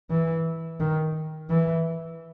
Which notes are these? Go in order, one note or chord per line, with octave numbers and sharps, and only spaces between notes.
E3
D#3
E3